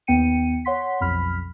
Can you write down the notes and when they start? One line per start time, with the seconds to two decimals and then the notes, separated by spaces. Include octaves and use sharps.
0.07 D#2 B3 G5 C#7 D#7
0.65 C#5 F#5 C6 B6
1.00 B1 F2 B5 F6 B6